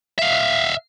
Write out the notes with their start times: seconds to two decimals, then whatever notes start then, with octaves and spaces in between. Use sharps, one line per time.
0.19 E5 F5